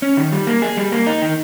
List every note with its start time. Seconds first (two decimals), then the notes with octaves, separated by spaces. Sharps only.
0.02 C#4
0.17 D#3
0.32 G3
0.47 A#3
0.62 G#4
0.77 G3
0.92 A#3
1.06 D#4
1.22 D#3